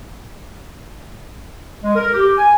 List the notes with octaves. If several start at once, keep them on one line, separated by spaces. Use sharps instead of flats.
G#3
A#4
G4
G#5